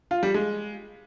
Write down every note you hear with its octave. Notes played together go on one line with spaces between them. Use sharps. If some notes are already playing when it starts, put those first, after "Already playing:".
F4
G3
G#3